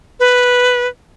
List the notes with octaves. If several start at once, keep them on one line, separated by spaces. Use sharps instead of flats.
B4